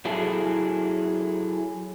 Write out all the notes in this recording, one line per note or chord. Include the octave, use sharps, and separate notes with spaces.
F#3 E4 G#4 A4